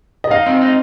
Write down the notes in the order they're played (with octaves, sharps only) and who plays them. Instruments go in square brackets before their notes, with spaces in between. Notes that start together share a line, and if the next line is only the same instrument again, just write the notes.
[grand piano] D#5
[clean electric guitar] D#4 [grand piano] F5
[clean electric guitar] C4
D#4